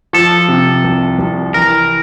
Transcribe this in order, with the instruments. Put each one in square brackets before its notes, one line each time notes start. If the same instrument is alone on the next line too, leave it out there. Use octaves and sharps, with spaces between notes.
[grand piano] F3 [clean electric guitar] A4
[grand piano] C3
C2
C2
[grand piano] E3 [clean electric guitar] A#4